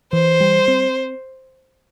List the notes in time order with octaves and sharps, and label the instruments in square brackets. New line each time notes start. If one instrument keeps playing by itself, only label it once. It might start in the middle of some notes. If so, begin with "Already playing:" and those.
[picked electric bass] E3 [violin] C5
[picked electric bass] G3
C4